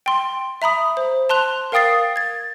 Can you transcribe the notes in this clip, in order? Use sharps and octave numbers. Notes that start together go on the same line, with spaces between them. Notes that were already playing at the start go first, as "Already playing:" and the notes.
G5 C6
E5 A#5 B5 D#6
C5
A5 C6 F#6 F7
A#4 F5 G5 D#6 A6 C7
G#6 A6